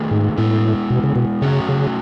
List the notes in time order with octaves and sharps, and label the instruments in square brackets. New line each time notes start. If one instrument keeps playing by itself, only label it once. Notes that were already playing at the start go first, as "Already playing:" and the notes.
Already playing: [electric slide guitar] D#3 A3 D#4 G#4
[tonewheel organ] G#2
[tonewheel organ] A2 [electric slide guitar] G#3 B3 E4
[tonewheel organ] B2
C#3
B2
[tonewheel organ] C#3 [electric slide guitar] F#3 A3 C#4 F#4 C#5
[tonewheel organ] C#3